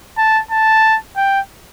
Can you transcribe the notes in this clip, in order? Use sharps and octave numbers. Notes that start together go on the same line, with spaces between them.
A5
A5
G5